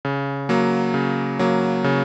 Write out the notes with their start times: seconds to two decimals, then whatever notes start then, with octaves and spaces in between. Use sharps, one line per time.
0.05 C#3
0.49 F#3 A#3
0.94 C#3
1.39 F#3 A#3
1.84 C#3